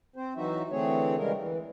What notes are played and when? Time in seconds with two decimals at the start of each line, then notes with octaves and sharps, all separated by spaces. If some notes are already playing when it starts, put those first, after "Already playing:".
0.16 C4 C5
0.36 E3 F#3 D#4 F#4 E5
0.71 D3 E3 A3 C4 G#4 C#5
1.17 C#3 E3 G3 G#3 A#4
1.36 E3